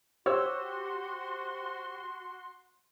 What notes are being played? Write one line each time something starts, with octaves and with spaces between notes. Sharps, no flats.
F#4 G4 C5 C#5 C6 E6